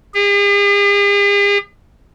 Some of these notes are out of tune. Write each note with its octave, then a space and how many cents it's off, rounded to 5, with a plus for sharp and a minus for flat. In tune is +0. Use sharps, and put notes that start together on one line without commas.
G#4 -45